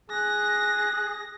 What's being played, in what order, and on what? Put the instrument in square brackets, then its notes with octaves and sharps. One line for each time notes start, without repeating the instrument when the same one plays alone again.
[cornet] G#4 [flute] F#6 [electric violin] A#6